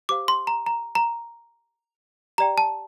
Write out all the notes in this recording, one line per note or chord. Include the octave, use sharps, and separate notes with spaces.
G4 C5 F5 D6
C6
A#5
A#5
A#5
G4 D5 G5 A#5
A5